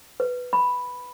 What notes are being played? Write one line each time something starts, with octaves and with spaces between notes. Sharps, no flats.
B4
B5